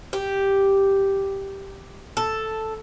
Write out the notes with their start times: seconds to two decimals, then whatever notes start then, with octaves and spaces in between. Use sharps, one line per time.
0.13 G4
2.17 A4